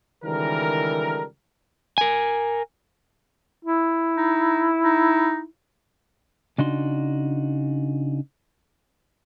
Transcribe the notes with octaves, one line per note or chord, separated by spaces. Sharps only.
C#2 D#3 E3 G3 A4 A#4
A#4 G#5
E4
D#4
D#4
C#3 D4 D#4 F#4 C6